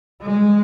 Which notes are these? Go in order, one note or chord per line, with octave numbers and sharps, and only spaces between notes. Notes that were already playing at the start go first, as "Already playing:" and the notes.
G#3